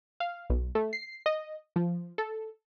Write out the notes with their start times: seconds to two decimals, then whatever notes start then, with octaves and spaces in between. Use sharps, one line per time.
0.20 F5
0.50 B1
0.75 A3
0.93 C7
1.26 D#5
1.76 F3
2.18 A4